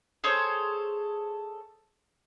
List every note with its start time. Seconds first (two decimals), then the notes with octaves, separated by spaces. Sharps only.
0.24 G#4 A4 C5 C#5